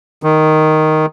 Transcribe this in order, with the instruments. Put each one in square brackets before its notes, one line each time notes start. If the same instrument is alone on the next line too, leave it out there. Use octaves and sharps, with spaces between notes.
[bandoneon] D#3